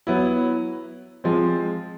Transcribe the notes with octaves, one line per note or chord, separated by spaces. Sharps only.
F#3 B3 E4
F3 G#3 C4